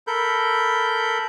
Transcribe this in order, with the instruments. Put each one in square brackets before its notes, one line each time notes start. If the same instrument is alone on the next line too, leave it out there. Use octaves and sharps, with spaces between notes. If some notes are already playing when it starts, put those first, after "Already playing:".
[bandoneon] A4 A#4 B5 G6